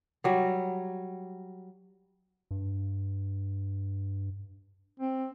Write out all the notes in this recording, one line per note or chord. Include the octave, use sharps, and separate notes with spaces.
F#3 G3
G2
C4